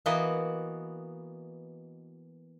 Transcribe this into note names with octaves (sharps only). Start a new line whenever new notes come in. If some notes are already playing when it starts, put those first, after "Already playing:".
E3 A#3 B3 F#4 D#5